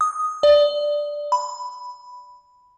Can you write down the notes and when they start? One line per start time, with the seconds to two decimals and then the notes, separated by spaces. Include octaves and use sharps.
0.01 D#6
0.43 D5
1.32 B5